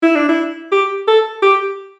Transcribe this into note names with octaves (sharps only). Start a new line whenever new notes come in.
E4
D4
E4
G4
A4
G4